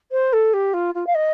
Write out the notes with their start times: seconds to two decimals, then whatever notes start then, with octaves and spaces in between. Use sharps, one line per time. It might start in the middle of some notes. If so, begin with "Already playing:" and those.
0.11 C5
0.33 A4
0.53 G4
0.73 F4
0.94 F4
1.06 F5
1.14 D#5